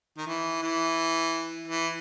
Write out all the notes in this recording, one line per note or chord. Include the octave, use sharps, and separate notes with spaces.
D#3
E3
E3
E3